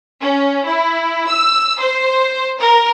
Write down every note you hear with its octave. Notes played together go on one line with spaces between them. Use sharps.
C#4
E4
E6
C5
A#4